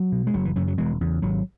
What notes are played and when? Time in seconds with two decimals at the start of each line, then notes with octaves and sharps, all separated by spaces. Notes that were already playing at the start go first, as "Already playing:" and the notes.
Already playing: F#3
0.12 B2
0.27 G#3
0.34 F#1 F#3
0.45 E3
0.56 F#2 C#3 F#3
0.68 F#3
0.78 E1 E3 G#3
1.01 E2 C#3
1.22 G#1 F#3